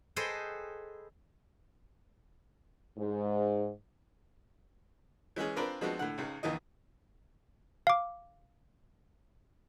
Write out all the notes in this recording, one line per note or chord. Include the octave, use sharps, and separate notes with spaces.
G#4 A4 B4 C5 D#5 G5
G#2
E3 G#3 C#4 G#4
C4 D4 F4 A#4 B4 D5
F3 G#3 B3 C4 D4 F#4
A2 D3 F#5
C#2 G#2 C#3
A#1 D#2 E3 D#5
F5 D6